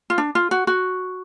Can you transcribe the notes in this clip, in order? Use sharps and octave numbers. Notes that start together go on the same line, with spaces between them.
F4
D4
F4
F#4
F#4